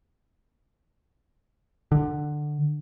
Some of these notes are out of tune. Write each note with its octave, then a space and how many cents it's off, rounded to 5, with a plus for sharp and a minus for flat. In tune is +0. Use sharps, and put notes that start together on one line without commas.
D3 +15